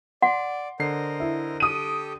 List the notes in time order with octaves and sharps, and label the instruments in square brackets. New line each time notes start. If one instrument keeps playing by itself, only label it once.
[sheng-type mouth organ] D5 [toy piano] F#5 [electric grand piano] C6
[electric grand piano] D3 C7 [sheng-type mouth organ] A#4 C5 D#5
[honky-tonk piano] E4
[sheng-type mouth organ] G4 A4 G5 [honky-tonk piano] D#6 D#7